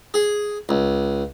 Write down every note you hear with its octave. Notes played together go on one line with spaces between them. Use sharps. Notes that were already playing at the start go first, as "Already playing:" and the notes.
G#4
C#2